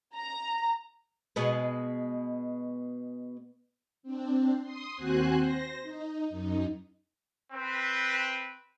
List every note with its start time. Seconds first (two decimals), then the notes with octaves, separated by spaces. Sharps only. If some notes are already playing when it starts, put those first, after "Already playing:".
0.15 A#5
1.36 B2 G#3 B3
4.03 C4 D4
4.62 C6 D#6
4.95 D#2 C4 F#4 C5 G#5 F#6
5.39 C5 A#6
5.83 D#4
6.30 F#2 D#4
7.53 C4 B4